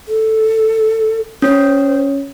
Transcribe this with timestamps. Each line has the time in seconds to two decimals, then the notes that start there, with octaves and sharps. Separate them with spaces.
0.07 A4
1.42 C#4 C5